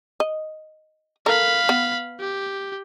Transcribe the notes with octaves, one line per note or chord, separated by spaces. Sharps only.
D#5
A4 A#4 F5 A#5 B5
B3
G4